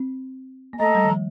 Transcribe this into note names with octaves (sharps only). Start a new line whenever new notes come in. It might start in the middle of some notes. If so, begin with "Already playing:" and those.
Already playing: C4
A#3
A3 A4 D#5 A#5
G3
D#3
F3